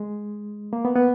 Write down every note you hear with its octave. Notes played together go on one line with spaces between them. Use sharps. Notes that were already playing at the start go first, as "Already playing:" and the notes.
Already playing: G#3
A#3
B3
B3